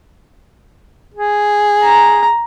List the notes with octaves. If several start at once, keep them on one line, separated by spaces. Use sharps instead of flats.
G#4
A#5